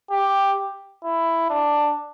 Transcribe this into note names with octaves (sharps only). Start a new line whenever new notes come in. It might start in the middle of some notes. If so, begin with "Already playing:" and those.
G4
E4
D4